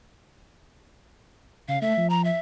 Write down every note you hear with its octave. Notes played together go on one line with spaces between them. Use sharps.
C#3 F5
A3 E5
F3
A#5
E5